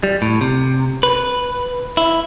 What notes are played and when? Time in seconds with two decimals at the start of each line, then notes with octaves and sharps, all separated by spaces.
0.03 G3
0.22 A2
0.41 C3
1.03 B4
1.97 E4